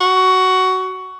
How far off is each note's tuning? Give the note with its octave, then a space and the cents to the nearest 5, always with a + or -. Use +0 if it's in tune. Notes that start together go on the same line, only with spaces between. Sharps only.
F#4 +15